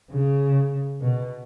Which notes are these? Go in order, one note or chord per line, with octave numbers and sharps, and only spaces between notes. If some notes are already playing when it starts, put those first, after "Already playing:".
C#3
B2